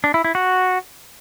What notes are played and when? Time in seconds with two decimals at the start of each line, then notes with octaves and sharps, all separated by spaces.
0.04 D4
0.14 E4
0.24 E4
0.35 F#4